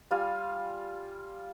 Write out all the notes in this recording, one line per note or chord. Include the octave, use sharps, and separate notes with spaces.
G3 F4 F5 G#5